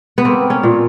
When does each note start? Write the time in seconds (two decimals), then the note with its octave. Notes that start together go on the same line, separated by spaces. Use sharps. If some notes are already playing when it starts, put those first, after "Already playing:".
0.18 B3
0.25 A#3 C4
0.50 C#4
0.63 A#2